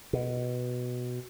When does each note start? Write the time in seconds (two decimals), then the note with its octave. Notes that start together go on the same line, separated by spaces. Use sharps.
0.13 B2